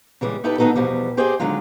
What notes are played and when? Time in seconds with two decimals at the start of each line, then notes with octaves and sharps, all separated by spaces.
0.21 C#3 E3 G3 G#3
0.44 D#4 E4 G4 A4 B4
0.58 A2 D#3 B3 D#4 F#4 A4
0.75 E2 B2 F3 G3
1.17 G4 G#4 C5 D5 D#5 G5
1.40 D3 D#3 F#3 G#3 F4